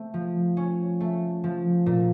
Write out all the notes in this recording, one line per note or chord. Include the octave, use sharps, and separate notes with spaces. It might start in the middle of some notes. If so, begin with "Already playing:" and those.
Already playing: A3 C4
F3
C#4
A3
F3
A#2